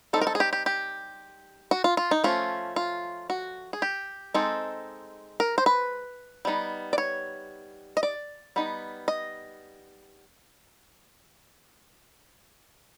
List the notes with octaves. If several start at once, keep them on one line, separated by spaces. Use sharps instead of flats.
G3 C4 D#4 A4
A#4
A4
G#4
G4
G4
G4
F#4
F4
F4
D#4
F3 A3 C#4 F4
F4
F#4
G#4
G4
G#3 C4 D#4 A4
A#4
C5
B4
G3 B3 D#4
D5
C#5
D#5
D5
G3 B3 D#4
D#5